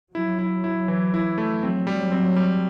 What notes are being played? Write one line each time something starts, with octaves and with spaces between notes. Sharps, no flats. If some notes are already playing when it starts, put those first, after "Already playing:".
F#3 E4
E4
E4
E3
E4
A3
F#3 C4
G3
C4
G3